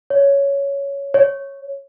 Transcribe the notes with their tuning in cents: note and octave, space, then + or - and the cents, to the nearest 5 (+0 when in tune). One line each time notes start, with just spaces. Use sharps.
C#5 +10
C#5 -5